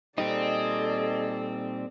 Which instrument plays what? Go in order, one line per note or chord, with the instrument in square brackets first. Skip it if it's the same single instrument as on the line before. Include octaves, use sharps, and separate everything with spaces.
[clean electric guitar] A#2 G3 D#4 [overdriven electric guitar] C4 [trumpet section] G#4 D#5 [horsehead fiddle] A4 D5